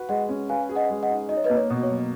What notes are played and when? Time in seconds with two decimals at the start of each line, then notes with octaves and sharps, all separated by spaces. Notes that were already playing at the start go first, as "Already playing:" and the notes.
Already playing: F#4 B4
0.09 G#3 D#5 F#5
0.29 C#4
0.49 B4 F5 G#5
0.69 G#4
0.76 D#5 F#5
0.90 G#3
1.03 D#5 F#5
1.10 D#4
1.29 D#4 D#5
1.37 C#5
1.44 B4 D#5
1.50 A#3
1.57 C#5
1.70 B2
1.83 C#5
1.90 F#3